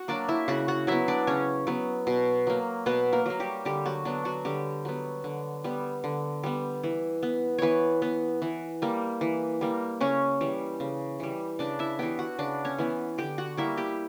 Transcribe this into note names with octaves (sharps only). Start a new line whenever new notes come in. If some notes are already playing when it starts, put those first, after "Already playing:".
Already playing: F#4 F#5
F#3 A#3 D4 D5
E4 E5
C#3 F#4 F#5
F#4 F#5
F#3 B3 E4 E5
D4 D5
C#3 C#4 C#5
F#3 B3
B2
F#3 A#3
B2 B3 B4
A#3 A#4
F#3 A#3
G3 G4
D3 G3 G4
F#3 F#4
F#3 B3 D4
F#3 F#4
D3 G3 G4
F#3 B3
D3
G3 B3
D3
G3 B3
E3
B3
E3 B3 B4 C#5
B3
E3
G3 A#3
E3
G3 A#3
C#3 C#4 C#5
E3 G3
C#3
E3 G3
C#3 D4 D5
E4 E5
E3 B3 G4 G5
F#4 F#5
C#3 D4 D5
C#4 C#5
E3 B3
D3 G4 G5
F#4 F#5
G3 A#3 E4 E5
G4 G5